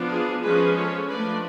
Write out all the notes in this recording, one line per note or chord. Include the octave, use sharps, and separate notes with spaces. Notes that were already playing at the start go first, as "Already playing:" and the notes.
Already playing: F3 B3 D4
F4 G#4
F3 G#3 C#4 G#4 B4
A4 C#5
F3 A3 D4 B4 D5